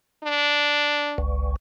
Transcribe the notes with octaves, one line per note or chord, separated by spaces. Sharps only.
D4
G1 C#2